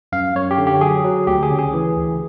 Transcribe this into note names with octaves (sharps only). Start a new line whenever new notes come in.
F#2 F5
F#2 C#5
G4
D3
G4
F#3 G#4
F#3
D2 G4
G#4
C#3
G#4
E3
D2